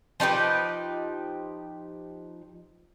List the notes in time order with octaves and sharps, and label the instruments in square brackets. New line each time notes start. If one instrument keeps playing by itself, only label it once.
[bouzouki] F3 D#4 G4 B4